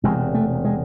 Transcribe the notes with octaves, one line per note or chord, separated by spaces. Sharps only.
E1 E2 C3 G#3
A3
G#3